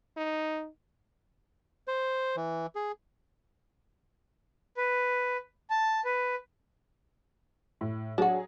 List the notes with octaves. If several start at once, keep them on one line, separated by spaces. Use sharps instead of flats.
D#4
C5
E3
G#4
B4
A5
B4
A2
F#3 D4 F#4 G#4 C#5